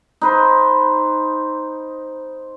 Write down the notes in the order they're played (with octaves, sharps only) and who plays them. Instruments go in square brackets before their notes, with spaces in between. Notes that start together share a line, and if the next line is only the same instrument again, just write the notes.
[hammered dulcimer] D#4 B4 C5